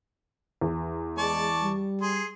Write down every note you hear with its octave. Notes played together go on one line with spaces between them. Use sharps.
E2
G#3 D5 A5 C#6
G3
G#4 C6